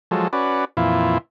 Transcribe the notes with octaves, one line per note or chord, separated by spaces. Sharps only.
F3 F#3 G#3 A4
C#4 F#4 B4 D5
F2 A#2 E3 E4 F4